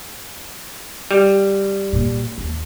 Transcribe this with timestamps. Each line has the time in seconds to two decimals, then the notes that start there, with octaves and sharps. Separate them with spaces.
1.11 G3
1.93 A#2
2.38 D#2